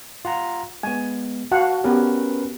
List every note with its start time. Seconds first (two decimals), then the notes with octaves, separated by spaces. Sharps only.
0.25 F4 F#5 A#5
0.83 G#3 B3 G#5
1.51 F#4 F5 F#5 A5
1.84 B3 C#4 G4 A#4 B4